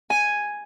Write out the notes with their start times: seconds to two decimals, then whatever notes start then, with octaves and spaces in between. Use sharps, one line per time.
0.10 G#5